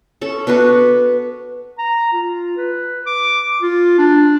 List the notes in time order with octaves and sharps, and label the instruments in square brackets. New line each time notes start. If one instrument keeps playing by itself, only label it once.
[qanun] C#4 A4
B3 D4 F#4 B4
[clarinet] A#5
F4
B4
D6
F4
D4